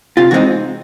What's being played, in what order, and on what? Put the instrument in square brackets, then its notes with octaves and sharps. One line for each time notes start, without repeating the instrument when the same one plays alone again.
[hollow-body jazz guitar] C3 F4
E3 G#3 C4 D#4 F#4